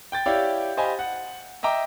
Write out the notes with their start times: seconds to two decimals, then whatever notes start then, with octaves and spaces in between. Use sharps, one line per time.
0.12 G5 G6 A6
0.26 E4 G4 C#5 D5 F5
0.77 G4 C5 D#5 F5 G#5 B5
0.99 F#5
1.63 D#5 E5 G5 A#5 D6